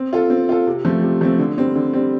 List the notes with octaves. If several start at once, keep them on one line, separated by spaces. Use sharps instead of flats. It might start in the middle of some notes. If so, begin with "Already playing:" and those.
Already playing: C4
F4 A4
C4
F4 A4
C3
F3 A3 C4
C3
F3 A3 C4
D3
G3 C4
D3
G3 C4